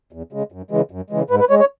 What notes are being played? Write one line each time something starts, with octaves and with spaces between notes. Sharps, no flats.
E2
C#3 G#3
F#2
C#3 E3 G#3
F#2
C#3 E3 G#3
G#2 B4
B4
G#3 C#5
C#5